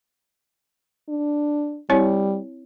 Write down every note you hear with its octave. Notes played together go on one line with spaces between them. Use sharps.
D4
G3 C4 E4 C#5